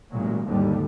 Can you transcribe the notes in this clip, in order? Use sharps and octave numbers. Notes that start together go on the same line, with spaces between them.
A1 A#2 F#3 G#3
G#1 D#2 D3 G3